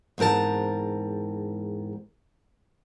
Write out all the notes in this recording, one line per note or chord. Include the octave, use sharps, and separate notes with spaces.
E2 G#2 C4 A#4 A5